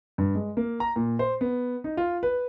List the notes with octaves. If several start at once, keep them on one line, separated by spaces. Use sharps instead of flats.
G2
G#3
A#3
A#5
A#2
C5
B3
D#4
F4
B4